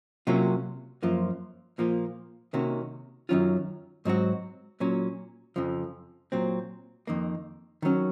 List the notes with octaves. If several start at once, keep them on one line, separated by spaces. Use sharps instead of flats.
C3 F#3 A#3 C#4 F4
F#2 F3 A#3 F4
A#2 F3 A#3 F4
C3 D#3 A#3 C#4 F#4
F#2 D#3 F#3 C#4 F4
G#2 F#3 C4 F#4
A#2 F#3 C#4
F2 C#3 F3
A#2 F#3 C4
F2 D#3 A#3
D#3 F#3 C#4